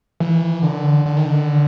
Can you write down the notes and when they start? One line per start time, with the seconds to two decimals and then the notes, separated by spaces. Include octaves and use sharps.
0.20 E3
0.63 D3
1.06 D3
1.16 D#3
1.27 D3